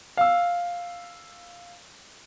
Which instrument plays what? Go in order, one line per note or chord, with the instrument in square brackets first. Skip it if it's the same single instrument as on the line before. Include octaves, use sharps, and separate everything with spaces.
[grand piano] F5 E6